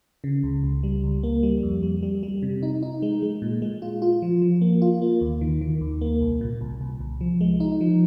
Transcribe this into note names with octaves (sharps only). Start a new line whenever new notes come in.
C#3
C#2
C#2
G3
C#2
A#3
G3
F2
G3
G3
G3
C3
D#4
D#4
G#3
G#3
A#2
G#3
F4
F4
F3
F3
A#3
F4
A#3
D#2
D#3
D#3
D#2
A#3
C2
A#2
C2
C2
C2
F3
G#3
D#4
F3